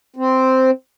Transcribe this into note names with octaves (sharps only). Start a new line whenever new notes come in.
C4